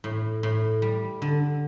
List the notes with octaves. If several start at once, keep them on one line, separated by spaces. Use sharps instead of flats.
A2
A2
G3
D3